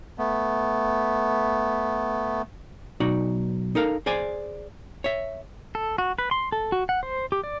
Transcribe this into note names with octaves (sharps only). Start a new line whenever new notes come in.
A3 B3
B1 D#4 F#4 D5
D#4 A4 A#4 F5
G#4 C5 D5 G#5
C#5 E5
A4
F#4
B4
C6
A4
F#4
F#5
C5
G4
D5